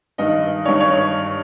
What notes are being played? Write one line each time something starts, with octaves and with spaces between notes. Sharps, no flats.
G2 D#3 D#5
G2 D#3 C#5
C#5